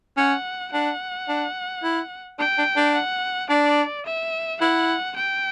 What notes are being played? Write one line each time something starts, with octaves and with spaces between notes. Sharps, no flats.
C#4 F#5
D4 F#5
D4
E4
D4 G5
D4
D4
F#5
D4 D5
E5
E4 F#5
G5